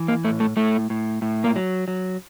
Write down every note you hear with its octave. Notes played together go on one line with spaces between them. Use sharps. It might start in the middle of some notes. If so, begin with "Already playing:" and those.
Already playing: E3
A#3
A2 A3
A3
A2 A3
A2
A2
A#3
F#3
F#3